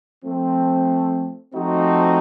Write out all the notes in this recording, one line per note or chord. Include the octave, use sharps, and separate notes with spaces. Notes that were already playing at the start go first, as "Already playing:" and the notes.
F3 A3 C4
F3 A3 C4 D#4 F#4